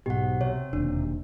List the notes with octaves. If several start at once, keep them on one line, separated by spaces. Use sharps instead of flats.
B1 G#2 B2 G4 F#5
C3 C#5
E1 D#2 D4